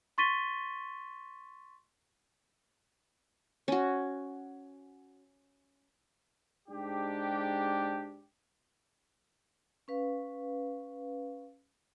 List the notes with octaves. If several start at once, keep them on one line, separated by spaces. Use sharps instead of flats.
C6 C#6 A6 B6 D#7 G7
C#4 F#4
G#2 D4 G4
C#4 B4 F5